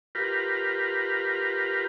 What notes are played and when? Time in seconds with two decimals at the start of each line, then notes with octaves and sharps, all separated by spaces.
0.15 F4 G4 A#4 B4